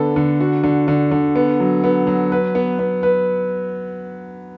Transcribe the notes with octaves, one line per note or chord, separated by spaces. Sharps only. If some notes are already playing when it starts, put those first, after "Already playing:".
Already playing: D3 B3 A4
D3
F#4
D3
D3
D3
B3
F#3
B3
F#3
B4
B3
B3
B4